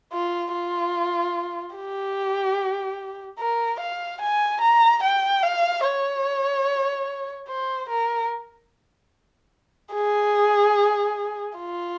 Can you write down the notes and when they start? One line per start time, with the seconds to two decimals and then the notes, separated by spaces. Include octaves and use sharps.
0.13 F4
0.53 F4
1.76 G4
3.39 A#4
3.80 F5
4.22 G#5
4.61 A#5
5.03 G5
5.43 F5
5.85 C#5
7.49 C5
7.89 A#4
9.94 G#4
11.58 F4